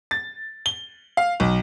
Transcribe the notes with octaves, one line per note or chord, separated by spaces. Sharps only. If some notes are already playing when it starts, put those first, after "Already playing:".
A6
G7
F5
B1